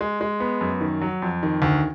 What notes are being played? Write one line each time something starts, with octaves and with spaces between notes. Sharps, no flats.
G#3
G#3
B3
F#2
D#3
F#3
F2
D#3
D2